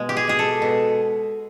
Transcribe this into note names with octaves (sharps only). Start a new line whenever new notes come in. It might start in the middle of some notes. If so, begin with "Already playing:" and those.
Already playing: B2 G#3
G4
G#4
G#3 G#4
A4
B2